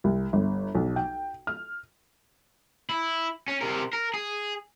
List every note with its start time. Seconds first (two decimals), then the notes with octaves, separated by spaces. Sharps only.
0.04 C2
0.33 G1
0.75 B1
0.96 G5
1.47 F6
2.89 E4
3.48 C#4
3.61 C3 A#4
3.93 A#4
4.14 G#4